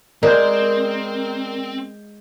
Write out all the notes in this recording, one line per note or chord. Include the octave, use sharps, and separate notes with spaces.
G#3 C4 A#4 D5 G6